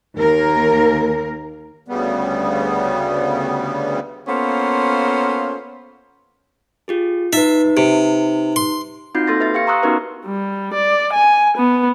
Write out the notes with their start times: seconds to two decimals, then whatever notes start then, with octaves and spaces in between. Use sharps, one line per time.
0.17 D#2 A#3 A#4
1.88 D2 C#3 G3 B3
4.27 A#3 B3 C#4 F4 A4 C5
6.88 F4 G4 G#4
7.33 D#4 B4 E5
7.77 C3
8.56 C6
9.15 C4 D#4 F4 F#4 G6 C7
9.27 A#3 A4 C6 A6 A#6
9.40 B4 E5 A6
9.54 G4 F5 A#6 C#7
9.67 A#5 C6 C#6 D#6 E6 F#6
9.83 B3 C#4 D#4 F#4 A#4 B4
10.25 G3
10.74 D5
11.13 G#5
11.57 B3